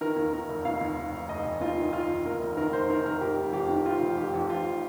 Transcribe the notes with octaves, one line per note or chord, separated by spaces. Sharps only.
D#3 A#4
D#2
D#2 A#4
F1
D#2 F5
D#2
F1
F1
F1 D#5
F1
D#2 F4
D#3
F1 F4
F1
D#2 A#4
F1
D#3 A#4
F1 C5
D#3 A#4
F1 A#4
F1 G4
F1
F2 G4
D#3
F2 F4
F1
F2 G4
F2
F2 F4